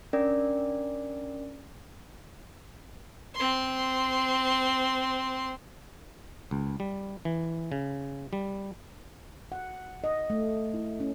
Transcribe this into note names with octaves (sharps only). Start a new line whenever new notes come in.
C#4 D4 A#4 D5
C4 C6
C#2
G3
E3
C#3
G3
F#5
D#5
A3
E4
C#4